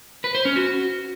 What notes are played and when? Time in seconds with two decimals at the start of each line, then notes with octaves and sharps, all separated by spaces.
0.24 B4
0.35 C5
0.45 C#4
0.56 F#4